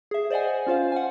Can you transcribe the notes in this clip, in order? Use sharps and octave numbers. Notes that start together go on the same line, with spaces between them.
G#4 E5
C5 D5 D#5 F#5 G#5
C#4 F4 C5 F5
F#5 G#5